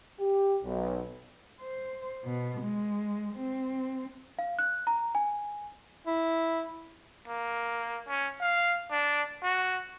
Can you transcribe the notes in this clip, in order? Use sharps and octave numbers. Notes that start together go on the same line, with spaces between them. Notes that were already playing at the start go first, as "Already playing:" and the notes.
G4
B1
C5
B2
G#3
C4
F5
F#6
A#5
G#5
E4
A#3
C#4
F5
D4
F#4